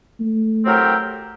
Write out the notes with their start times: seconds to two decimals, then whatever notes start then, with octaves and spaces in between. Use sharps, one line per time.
0.20 A3
0.65 A2 F#3 C4 G4 A#4